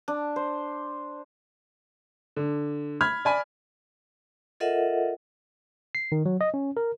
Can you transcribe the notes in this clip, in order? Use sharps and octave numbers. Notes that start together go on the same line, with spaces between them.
D4
C5
D3
B5 F6 G#6
D5 G#5 B5
F4 A4 A#4 D#5 E5 F#5
C7
D#3
F#3
D#5
C#4
A#4